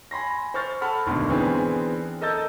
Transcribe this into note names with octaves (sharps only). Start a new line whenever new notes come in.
G#5 B5 C6 A#6
C5 C#6 F6 A6
A4 F#5 A5 B5 F6
G#1 D2 B2
E3 B3 C4 D4 G#4
A4 A#4 D#5 E6 G6 A6